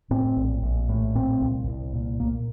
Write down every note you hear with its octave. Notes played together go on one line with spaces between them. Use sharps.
A2 C4
A#1
A#1
A2
A#2 C4
C2
C2
A#2
A#2 A#3